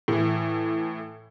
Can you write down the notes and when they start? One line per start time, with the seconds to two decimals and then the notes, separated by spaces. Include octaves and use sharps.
0.08 A2 E3